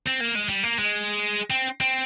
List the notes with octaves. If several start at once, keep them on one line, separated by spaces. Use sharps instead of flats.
C4
A#3
G#3
G3
A#3
G#3
C4
C4